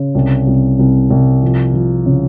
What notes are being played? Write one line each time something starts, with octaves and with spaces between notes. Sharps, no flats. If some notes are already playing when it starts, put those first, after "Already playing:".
Already playing: C#3
C2
C2
C2
C2
F3
F3
C#3